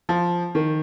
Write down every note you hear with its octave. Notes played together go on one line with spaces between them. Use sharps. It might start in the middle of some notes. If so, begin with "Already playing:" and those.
F3
D#3